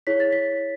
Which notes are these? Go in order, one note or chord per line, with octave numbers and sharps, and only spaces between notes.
E4 G#4 C#5 B6
A6
B6